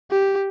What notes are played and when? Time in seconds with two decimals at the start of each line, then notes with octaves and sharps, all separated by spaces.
0.11 G4